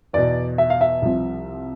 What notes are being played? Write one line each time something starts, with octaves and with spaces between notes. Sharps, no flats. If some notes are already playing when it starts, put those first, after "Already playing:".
E2 B2 D5
E5
F5
E5
C2 C3 F3